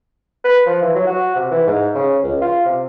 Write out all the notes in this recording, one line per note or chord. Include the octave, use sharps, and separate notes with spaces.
B4
F3
E3
F#3
F#4
C3
E3
G#2
C#3
C#2
F4
C3